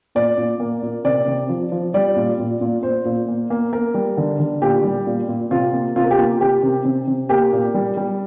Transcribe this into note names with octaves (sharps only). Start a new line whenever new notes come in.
A#2 D5
A#2
A#3
A#2
C3 D5
C3
F3
F3
G3 D5
A#2
A#2
A#2
A#2 C5
A#2
A#3
A#3
A#3 A#4
G3
D3
D3
A#2 G4
G3
A#2
A#2
C3 F4
A#3
C3 F4
A#4
G4
A#3 F4
C3 G4
C3
C3
C3
A#3 G4
A#2
G3
G3